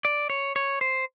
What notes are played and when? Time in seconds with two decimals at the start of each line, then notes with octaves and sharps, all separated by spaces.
0.05 D5
0.30 C#5
0.56 C#5
0.81 C5